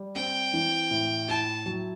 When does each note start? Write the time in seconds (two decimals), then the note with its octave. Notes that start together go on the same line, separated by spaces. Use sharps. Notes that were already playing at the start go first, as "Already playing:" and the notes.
Already playing: G3
0.15 C4 G5
0.53 E3
0.91 A2
1.28 E4 A5
1.66 F#3